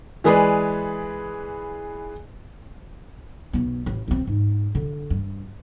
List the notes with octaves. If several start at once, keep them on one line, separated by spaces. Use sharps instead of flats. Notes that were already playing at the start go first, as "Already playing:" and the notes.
E3 G#3 G#4 B4 D5
B1 B3
A1
B1 C4
G#2
D3
G2